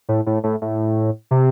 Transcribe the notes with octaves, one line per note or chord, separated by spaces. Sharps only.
A2
A2
A2
A2
C3